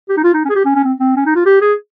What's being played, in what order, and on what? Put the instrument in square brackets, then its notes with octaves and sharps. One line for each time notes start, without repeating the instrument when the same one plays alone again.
[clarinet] G4
D#4
F4
D#4
C#4
G#4
G4
C#4
C#4
C4
C4
C#4
D#4
F4
G4
G#4